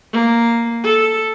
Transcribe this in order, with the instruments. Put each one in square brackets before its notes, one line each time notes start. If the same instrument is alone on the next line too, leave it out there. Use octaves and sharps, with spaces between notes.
[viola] A#3
A4